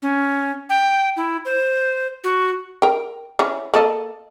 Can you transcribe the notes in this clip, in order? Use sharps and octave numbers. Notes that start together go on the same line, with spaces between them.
C#4
G5
E4
C5
F#4
A#4 G5
E3 C#4
A#3 A4 D#5